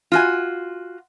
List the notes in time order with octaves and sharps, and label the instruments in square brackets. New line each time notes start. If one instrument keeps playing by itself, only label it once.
[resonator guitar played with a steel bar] F4 F#4 G#5